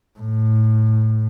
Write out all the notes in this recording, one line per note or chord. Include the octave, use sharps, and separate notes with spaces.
A2